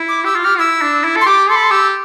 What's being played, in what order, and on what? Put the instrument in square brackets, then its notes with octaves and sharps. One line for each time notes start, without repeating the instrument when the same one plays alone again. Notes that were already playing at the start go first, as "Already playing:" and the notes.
Already playing: [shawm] E4
[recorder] D6
[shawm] G4 [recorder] E6
[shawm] F4
[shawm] G4 [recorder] F6
[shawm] E4 [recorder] E6
[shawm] D4
E4
A4
[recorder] C6
[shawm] G4 [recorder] D6
[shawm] A4 [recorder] C6
[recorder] B5
C6
[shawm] G4 [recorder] E6